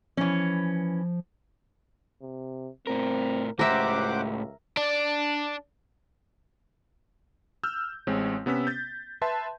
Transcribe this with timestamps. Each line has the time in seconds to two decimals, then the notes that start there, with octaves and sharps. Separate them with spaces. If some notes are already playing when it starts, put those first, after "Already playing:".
0.17 E3 F3 C#4
2.21 C3
2.87 A2 C4 A#4
3.59 C#2 A2 G4 A#4 C5 E5 F#5 D6
4.77 D4
7.64 E6 F6 G6
8.07 A1 G#3 C4 C#5
8.46 C3 B3 C#4 E6 B6
8.67 G6 A6
9.22 B4 E5 A5 C6